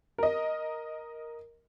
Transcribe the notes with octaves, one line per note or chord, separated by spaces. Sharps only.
A#4 D#5